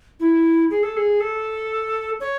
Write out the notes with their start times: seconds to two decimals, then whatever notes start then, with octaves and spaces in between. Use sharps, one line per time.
0.20 E4
0.70 G#4
0.83 A4
0.97 G#4
1.20 A4
2.20 C#5